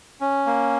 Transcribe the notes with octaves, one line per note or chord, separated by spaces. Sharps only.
C#4
A#3